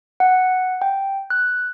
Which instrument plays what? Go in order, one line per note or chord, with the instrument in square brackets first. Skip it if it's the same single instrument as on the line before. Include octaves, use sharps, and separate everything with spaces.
[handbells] F#5
G5
F#6